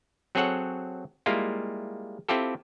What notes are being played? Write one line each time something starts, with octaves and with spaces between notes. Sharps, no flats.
F#3 C4 G#4 A4 C#5 F#5
G3 G#3 A#3 E4 F4
C4 E4 F4 G4 A4